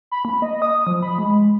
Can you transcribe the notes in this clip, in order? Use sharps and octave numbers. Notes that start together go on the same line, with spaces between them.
B5
A#3
D#5
D#6
F3
B5
G#3